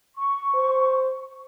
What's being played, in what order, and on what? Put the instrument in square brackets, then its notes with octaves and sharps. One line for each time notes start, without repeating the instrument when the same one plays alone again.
[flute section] C#6
[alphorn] C5